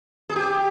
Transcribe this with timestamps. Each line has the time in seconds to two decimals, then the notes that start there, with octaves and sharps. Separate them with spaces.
0.29 G#4
0.36 G4